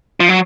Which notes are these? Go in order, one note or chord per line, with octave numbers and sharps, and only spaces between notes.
F3
F#3